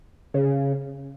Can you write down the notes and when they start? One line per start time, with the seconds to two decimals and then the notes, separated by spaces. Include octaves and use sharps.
0.34 C#3